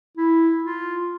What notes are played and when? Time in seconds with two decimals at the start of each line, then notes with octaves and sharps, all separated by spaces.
0.17 E4
0.64 F4